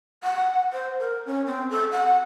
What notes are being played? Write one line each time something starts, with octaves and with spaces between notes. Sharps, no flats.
F#5
C5
A#4
C#4
C4
A4
F#5